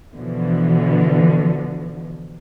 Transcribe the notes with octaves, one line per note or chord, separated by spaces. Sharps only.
B2 D3 E3 F3